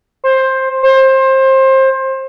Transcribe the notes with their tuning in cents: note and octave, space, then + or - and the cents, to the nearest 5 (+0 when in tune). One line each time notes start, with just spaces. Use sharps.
C5 +15
C5 +25